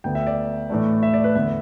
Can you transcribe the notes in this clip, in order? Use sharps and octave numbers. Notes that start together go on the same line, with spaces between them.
D2 D3 B3 G5
E5
D5
A2 E3 A3 D4
E5
D5
B4
E2 D3 B3 E5